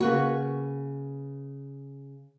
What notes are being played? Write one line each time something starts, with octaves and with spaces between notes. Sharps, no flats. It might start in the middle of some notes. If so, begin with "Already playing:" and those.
C#3 A#3 F#4 B4 C#6